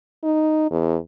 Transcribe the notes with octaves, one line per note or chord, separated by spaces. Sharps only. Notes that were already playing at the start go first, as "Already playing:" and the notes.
D#4
E2